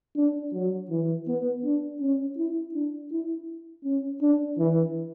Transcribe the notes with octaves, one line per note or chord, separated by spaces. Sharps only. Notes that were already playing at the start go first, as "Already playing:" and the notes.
D4
F#3
E3
B3
D4
C#4
E4
D4
E4
C#4
D4
E3